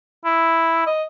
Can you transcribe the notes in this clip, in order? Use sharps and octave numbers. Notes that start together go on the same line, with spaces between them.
E4
D#5